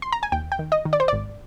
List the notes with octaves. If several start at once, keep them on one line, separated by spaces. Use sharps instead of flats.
C6
A#5
G#5
D#2 G5
G5
D#3
D#5
D#3
D5
C5
G#1 D5